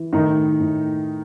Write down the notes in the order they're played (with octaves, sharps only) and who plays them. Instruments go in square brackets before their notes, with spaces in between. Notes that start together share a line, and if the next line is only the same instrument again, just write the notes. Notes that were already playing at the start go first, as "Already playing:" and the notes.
Already playing: [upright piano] E3
A2 D#3 D#4
A2